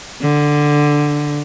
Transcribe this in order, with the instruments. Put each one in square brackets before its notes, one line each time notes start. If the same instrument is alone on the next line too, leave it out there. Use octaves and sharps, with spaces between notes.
[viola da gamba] D3